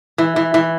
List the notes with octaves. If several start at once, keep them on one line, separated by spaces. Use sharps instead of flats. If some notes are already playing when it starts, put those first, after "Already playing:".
E3
E3
E3